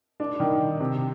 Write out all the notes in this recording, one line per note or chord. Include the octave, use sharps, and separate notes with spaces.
D4
D#3
C3